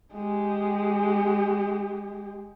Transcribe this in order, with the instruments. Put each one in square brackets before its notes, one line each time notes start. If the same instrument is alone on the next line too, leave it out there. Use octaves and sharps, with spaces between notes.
[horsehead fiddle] G#3 G4